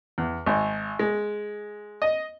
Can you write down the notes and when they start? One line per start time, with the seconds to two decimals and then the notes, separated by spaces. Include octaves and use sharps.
0.18 E2
0.46 G#1
0.99 G#3
2.02 D#5